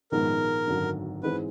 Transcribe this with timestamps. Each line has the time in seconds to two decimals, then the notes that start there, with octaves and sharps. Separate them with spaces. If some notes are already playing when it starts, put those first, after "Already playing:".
0.12 A#1 G#2 D#3 G#3 B3 A#4
0.68 G#1 F#2 D3
1.23 G#2 E3 G#3 C4 B4